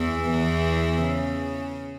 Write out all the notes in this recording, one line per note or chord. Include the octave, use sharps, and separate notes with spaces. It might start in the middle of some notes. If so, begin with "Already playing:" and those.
Already playing: E2 E3
E2 E3
C#3